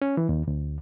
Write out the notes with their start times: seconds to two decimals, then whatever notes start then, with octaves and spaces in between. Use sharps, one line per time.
0.02 C#4
0.17 E3
0.29 D#2
0.48 D2